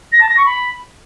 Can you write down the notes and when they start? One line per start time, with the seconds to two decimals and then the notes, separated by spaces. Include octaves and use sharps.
0.12 A#6
0.20 A5
0.28 A#6
0.37 C#6
0.45 B5